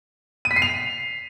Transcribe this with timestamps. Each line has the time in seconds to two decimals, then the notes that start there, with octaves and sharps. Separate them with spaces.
0.45 D#7
0.51 B6
0.56 C7
0.62 F7